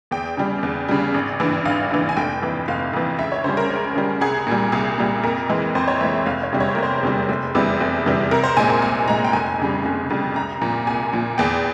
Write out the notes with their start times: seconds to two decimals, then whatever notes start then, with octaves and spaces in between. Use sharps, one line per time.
0.11 E2 G5
0.37 C#3 G3
0.63 E2
0.89 C#3 G3
1.14 G#1
1.40 G2 E3
1.65 G#1 F5
1.91 G2 E3
2.09 G#5
2.17 F1 G5
2.42 F2 E3
2.68 F1 F5
2.93 F2 E3
3.19 C#2 E5
3.32 C#5
3.44 C#3 G3 C5
3.57 A#4
3.70 C#2
3.95 C#3 G3
4.21 C2 G#4
4.47 A#2 G3
4.72 C2 G#4
4.98 A#2 G3
5.23 F2 A#4
5.49 E3 G#3
5.75 F2 C5
5.88 C#5
6.01 E3 G#3 E5
6.14 E5
6.26 F1 F5
6.43 C#5
6.52 E2 C3 G3
6.60 C#5
6.68 C5
6.75 F1 A#4
6.83 C5
7.03 E2 C3 G3
7.29 F1
7.55 E2 C3 E3 G3
7.80 F1
8.06 E2 C3 E3 G3
8.31 C2 A#4
8.44 C5
8.57 A#2 G#3 G#5
8.70 G#5
8.82 C2 G#5
9.08 A#2 G#3 A#5
9.25 G5
9.33 F1 G#5
9.59 F2 C#3 G3
9.85 F1
10.10 F2 C#3 G3
10.35 C2 A#5
10.61 A#2 F3
10.87 C2 G#5
11.13 A#2 F3
11.38 E2 G5